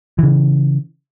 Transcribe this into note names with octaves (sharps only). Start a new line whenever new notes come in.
C#3 E3